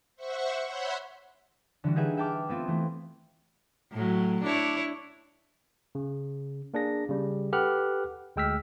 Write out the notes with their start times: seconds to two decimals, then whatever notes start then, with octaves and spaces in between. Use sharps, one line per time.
0.16 C5 E5 F#5 C#6
0.65 C5 C#5 E5 F#5 B5 C6
1.84 D3 E3 G3 F#4
1.96 D#4 G4 G#4 B4 E5 F#5
2.17 E5 G5 A5 D6 F6
2.49 A3 B3 C4 F4
2.67 E3 A3
3.93 A2 F#3
4.44 D4 E4 C#5
5.95 C#3
6.74 A#3 D4 G#4 A#6
7.09 C#3 G3
7.53 G4 A4 B4 F#5 F6 F#6
8.36 D2 G#3 G5 E6 F6 B6